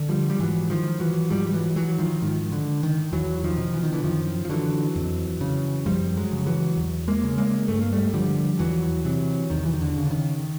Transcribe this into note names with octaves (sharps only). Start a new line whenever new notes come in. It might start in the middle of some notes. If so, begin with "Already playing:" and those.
Already playing: D3
F3 G3
G3
G#2 E3 F#3
D#3 F3
E3 F#3
G#2 F3 G3
G3
E3 F#3
E3 F#3
D#3 F3
G#2 D#3
D3
D#3
E2 E3 F#3
D#3 F3
B2
E3
D#3
D3 E3
F#2 D#3 F3
F3
D3 E3 F#3
F2
C#3
F#2 F3 G3
F#3 G#3
C#3
E3 F#3
E2
G#3 A#3
C#3
G#3 A#3
G2 A3
A#3
G3 A3
D3 F3 G3
E2 E3 F#3
C3 E3 F#3
E2 D#3
E3
D#3
D3
C#3
D3
D#3